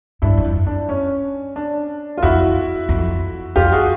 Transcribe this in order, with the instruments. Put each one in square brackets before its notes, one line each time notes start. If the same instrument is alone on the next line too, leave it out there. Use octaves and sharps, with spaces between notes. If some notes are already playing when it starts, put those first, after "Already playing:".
[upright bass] G2 [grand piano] D4 E4
[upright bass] F#2
F2
[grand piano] D4
C#4
D4
F4
[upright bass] F2 [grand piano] E4 F#4
[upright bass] F2
[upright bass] F2 [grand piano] F4 G4
[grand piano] F#4 G#4